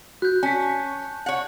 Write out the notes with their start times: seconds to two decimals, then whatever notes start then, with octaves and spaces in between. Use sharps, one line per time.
0.22 F#4 F#6 G6
0.43 C#4 G#5 A5 B6
1.26 C#5 F#5